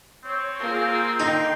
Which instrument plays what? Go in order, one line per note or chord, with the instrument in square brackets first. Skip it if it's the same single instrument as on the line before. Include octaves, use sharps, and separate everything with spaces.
[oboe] C4 [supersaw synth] C#5
[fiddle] A#3 [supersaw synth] F4 G#4
[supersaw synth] D3 G5 C6 [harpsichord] D#4